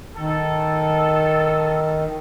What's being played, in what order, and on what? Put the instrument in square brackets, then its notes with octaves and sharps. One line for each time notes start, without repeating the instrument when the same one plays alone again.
[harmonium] D#3 [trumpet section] A4